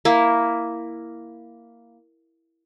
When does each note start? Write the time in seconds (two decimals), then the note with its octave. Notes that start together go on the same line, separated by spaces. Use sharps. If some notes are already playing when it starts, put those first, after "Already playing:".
0.05 A#3 E4